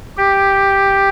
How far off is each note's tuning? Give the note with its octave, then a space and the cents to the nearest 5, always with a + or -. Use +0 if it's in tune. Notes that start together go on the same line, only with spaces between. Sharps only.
G4 +5